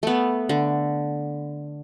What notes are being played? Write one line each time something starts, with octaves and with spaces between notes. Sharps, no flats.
A3 B3
D3